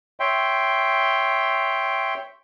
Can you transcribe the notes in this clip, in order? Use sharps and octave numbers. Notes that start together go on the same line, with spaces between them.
C#5 E5 G5 C6